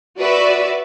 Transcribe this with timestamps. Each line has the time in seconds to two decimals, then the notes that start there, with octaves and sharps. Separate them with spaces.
0.19 F#4 B4 D5 E5